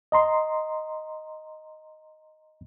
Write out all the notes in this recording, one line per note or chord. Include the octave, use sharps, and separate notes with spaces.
D#5 A#5 C6